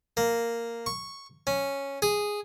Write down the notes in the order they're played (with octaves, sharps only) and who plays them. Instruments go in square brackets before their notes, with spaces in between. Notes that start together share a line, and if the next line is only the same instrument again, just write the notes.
[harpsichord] A#3
C#6
C#4
G#4